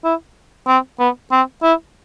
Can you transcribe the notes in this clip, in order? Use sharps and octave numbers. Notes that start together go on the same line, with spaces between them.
E4
C4
B3
C4
E4